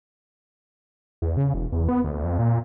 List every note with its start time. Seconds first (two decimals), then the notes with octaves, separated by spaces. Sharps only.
1.22 E2
1.37 C#3
1.54 E1
1.72 E2
1.89 B3
2.04 D2
2.24 F2
2.39 A#2